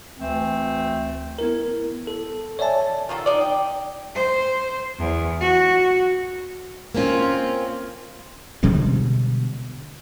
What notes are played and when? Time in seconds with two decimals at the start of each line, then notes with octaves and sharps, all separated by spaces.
0.19 D2 E3 A3 C4
1.39 B3 E4 A#4
2.07 A4
2.59 C#5 D5 E5 G#5 A5
3.09 D#3 F4 F#4 A4
3.26 D#4 D5
3.41 G5
4.15 C5
4.99 E2
5.40 F#4
6.95 A#3 C4 C#4 F4
8.63 B2 D3 G3 G#3